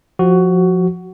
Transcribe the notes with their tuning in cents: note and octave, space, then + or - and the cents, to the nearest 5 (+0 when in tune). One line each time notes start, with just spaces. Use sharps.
F3 +20 F#4 +15